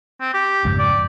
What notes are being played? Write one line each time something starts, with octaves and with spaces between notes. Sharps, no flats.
C4
G4
F2 G#2 C#3
D5